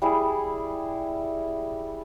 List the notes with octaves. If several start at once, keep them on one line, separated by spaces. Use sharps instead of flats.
G3 E4 G#4